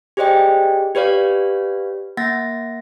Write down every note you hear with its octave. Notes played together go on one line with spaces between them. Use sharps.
G4 G#4 C5 D5 D#5 G5
G4 B4 C#5 D5 F5
A#3 F#5 A6 A#6